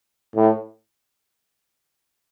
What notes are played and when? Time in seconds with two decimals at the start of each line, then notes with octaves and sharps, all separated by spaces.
0.36 A2